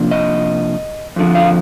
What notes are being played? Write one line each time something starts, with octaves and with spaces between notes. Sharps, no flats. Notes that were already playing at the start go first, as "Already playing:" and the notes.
Already playing: C3 F3 A#3 D4
D#5
F2 D3 F3
F5